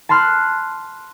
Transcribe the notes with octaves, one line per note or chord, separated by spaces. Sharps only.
A5 B5 C6 F6 F#6